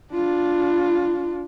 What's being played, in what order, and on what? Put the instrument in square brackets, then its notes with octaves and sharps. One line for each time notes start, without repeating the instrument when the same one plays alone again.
[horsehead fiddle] D4 F4